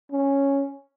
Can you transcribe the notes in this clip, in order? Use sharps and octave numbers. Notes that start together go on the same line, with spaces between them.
C#4